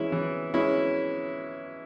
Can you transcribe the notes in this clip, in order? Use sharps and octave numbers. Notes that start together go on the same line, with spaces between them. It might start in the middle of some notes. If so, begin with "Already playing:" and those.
Already playing: E3 G#3 C#4 E4
E3
G#3 C#4 E4